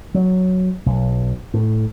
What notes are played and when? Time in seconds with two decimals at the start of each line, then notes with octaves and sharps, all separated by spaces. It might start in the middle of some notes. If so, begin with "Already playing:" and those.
0.14 F#3
0.86 B1
1.54 A2